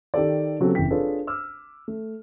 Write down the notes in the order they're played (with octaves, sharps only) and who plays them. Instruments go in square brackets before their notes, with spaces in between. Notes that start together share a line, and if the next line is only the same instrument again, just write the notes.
[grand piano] D#3 G4 A4 D5
C#3 F#3 B3 C4 G4 A4
F1 C#3 E3 G5 B6
D4 F4 G#4 A4 B4 C#5
D6 E6 F6
A3